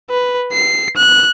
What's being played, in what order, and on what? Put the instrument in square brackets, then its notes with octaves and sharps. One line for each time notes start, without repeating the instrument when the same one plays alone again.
[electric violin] B4
C7
F#6